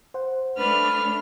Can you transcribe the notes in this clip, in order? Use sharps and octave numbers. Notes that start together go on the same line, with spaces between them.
C5 F#5
A3 D4 B4 F6